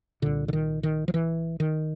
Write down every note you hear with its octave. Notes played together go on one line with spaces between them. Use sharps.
C2 A#2 D3
D3
D#3
D#3
F3
E3
D#3